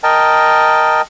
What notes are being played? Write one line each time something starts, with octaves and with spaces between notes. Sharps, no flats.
A#4 D#5 G5 A5